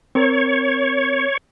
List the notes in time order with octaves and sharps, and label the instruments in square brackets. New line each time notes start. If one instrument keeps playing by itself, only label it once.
[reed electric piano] C4 A#4 [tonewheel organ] C#5